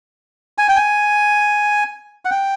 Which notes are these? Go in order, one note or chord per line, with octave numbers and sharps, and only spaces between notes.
G#5
G5
G#5
F#5
G5